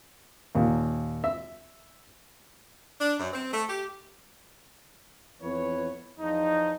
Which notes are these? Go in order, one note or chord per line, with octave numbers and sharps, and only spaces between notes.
D#2 A#2
E5
D4
F#2
C4
A3
G4
F2 E3 B3 B4 C#5
E2 F3 D#4